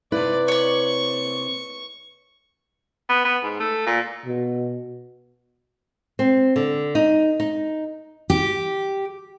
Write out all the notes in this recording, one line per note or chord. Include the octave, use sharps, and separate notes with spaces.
C3 E4 B4 D5
C#5 D5 C#6
B3
B3
G#2
A3
A#2
B2
C4
D3
D#4
D#4
G4